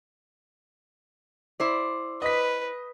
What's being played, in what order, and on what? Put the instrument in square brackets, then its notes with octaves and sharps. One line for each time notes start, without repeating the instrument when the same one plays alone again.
[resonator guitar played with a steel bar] E4 C5 D5
[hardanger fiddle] B4 [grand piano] D#5 B6